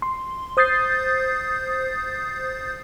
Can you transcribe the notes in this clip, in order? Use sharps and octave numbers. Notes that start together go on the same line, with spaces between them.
C6
C5 D#6 G6 A6 C7